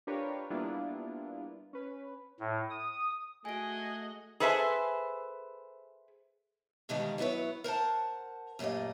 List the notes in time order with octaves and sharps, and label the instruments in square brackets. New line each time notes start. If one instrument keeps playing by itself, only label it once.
[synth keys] D4 F4 G4 A#4 B4 C#5
G3 A#3 B3 D4 E4 F4
C#4 B4
[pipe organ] A2
D#6
[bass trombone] A3 [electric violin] F#4 D#5 [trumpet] G#4 [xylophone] G#5 D7
[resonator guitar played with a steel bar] G#4 A4 B4 C5 E5 G#5
[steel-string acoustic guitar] B2 D3 D#3 F3 G3 G#3
F#3 B3 E4 B4 C#5
A#4 C5 F#5 A5
F#2 A#2 G3 A3 D#5